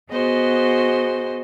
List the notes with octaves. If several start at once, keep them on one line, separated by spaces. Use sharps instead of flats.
B3 F#4 G#4 C5 D#5